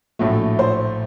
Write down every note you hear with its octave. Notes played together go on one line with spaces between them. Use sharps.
A#1 A2 F#3 A3
C5